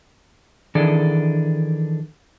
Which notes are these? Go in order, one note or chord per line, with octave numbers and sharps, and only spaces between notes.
D#3 E3 D4 G#4 A4 D5